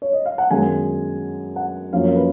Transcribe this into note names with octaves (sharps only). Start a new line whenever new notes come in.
C#5
D#5
F5
F#5
F#2 D#3 G#3 B3 G#5
F#5
F#2 F3 A#3 C#4 F5
C#5
B4